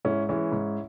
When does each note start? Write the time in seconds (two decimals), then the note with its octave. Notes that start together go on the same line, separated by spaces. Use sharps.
0.05 G#2 C#4 E4
0.29 E3 G#3 C#4 E4
0.52 G#2